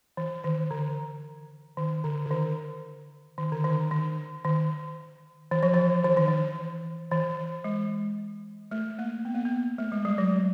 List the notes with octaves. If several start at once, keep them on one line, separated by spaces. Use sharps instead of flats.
E3
D#3
D3
D#3
D3
D3
D#3
D#3
D3
D#3
D#3
D#3
E3
F3
E3
E3
D#3
E3
E3
G#3
A3
A#3
B3
A#3
B3
A3
G#3
G3
F#3